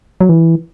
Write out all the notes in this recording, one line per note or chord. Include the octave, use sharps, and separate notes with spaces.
F#3
E3